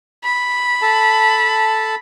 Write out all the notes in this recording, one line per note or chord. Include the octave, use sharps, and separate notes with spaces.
B5
A4 A5